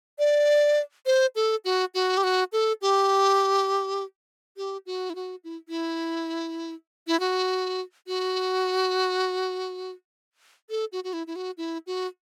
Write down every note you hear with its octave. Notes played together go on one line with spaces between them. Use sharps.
D5
C5
A4
F#4
F#4
G4
F#4
A4
G4
G4
F#4
E4
F#4
E4
E4
E4
F#4
F#4
A4
F#4
F#4
E4
E4
F#4
E4
F#4